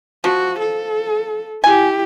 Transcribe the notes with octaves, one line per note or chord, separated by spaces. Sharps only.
F3 F#4
A4
E4 G4 G#5